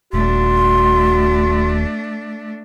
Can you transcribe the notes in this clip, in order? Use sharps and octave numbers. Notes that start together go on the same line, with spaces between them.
D#1 A3 D4 F#4 C6